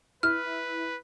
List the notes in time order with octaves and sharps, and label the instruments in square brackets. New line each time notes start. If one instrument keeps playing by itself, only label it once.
[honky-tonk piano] E4 [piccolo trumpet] B4 [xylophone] F6